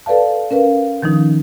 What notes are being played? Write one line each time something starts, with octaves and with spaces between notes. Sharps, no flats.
A4 B4 D5 F5 A5
C#4 A#4 B4 F5
D#3 F3 C#4 D#4